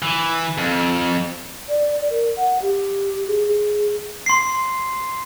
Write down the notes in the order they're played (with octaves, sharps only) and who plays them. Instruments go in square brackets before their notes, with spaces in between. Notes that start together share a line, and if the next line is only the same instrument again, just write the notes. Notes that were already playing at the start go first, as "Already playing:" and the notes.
[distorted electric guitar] E3
F2
[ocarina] D5
A#4
F#5
G4
G#4
G#4
[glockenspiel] C6 C7